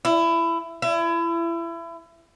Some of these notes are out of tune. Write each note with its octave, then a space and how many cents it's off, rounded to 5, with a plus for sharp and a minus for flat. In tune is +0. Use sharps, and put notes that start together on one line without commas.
E4 +20
E4 +30